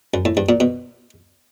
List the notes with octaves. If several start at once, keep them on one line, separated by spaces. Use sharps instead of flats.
F#2
A2
G2
A#2
B2